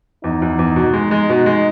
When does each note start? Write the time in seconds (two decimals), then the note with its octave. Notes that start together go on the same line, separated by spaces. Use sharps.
0.24 E2 D#4
0.42 E2
0.59 E2
0.76 B2
0.94 G#3
1.11 G#3
1.29 B2
1.46 G#3